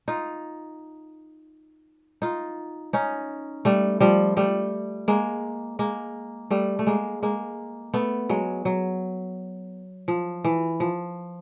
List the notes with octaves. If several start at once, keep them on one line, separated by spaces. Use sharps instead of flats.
D#4 F4
D#4 F4
C#4 D#4
G3 A3
F3 G3
G3 A3
G#3 A#3
G#3 A#3
G3 A3
A3
G#3 A#3
G#3 A#3
A3 B3
F#3 G#3
F#3
F3
E3
F3